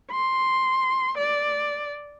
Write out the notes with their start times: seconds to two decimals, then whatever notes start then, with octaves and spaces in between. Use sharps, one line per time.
0.12 C6
1.18 D5